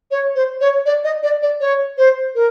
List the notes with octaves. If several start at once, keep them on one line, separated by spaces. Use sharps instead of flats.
C#5
C5
C#5
D5
D#5
D5
D5
C#5
C5
A#4